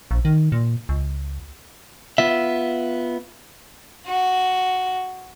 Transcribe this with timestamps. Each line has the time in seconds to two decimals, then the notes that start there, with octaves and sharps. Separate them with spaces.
0.11 A#1
0.25 D#3
0.52 A#2
0.89 C#2
2.18 B3 F4 E5
4.07 F#4